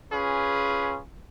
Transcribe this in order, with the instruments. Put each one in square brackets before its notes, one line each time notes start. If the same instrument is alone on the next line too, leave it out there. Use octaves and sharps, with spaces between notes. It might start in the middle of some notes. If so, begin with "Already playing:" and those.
[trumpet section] C#4 F4 G#4 B4